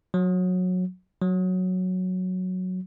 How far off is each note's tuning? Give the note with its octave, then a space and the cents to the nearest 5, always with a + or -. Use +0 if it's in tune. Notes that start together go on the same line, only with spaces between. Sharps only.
F#3 -20
F#3 -5